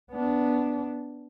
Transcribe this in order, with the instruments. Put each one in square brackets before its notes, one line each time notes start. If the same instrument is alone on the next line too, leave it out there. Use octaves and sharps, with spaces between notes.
[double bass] B3 D4